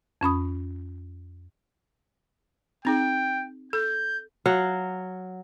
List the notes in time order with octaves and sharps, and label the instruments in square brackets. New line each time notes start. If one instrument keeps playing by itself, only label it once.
[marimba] F2 C#4 B5 D#6
[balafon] C4 D#4 G#4 [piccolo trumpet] G5
[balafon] A4 [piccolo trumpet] G6
[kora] F#3 F5 F#5